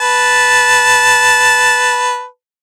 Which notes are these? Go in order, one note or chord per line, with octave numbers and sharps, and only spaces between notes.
B4 A5